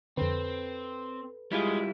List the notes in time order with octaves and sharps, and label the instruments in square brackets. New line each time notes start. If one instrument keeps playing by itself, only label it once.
[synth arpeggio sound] F2 D3 [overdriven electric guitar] C4 [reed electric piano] A4 B4
[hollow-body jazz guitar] G3 E4 F4 [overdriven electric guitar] G#3